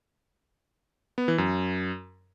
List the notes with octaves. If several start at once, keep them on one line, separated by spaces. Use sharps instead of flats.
B3
E3
F#2